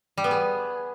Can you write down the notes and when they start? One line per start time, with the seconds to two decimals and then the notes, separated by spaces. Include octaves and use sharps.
0.17 G3
0.24 B3
0.31 G#4